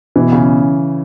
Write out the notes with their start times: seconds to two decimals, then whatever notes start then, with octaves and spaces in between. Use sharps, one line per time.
0.16 B2 E3
0.32 C#3 C#4